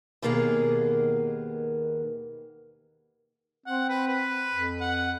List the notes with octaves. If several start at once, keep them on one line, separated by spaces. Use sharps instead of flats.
D#2 B2 D#3 A#3 B3 G#4
C4 F#5
B4
B4
F2
F#5